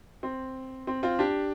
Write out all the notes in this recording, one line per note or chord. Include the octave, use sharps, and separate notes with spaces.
C4
C4
C4 F4
D4 G4